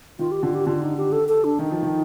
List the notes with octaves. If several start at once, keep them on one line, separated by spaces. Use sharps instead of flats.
D#3 F4
G4
D3 F4
G4
D3 F4
D#4
G4
A4
A4
D4
D#3 D#4
F3
D#3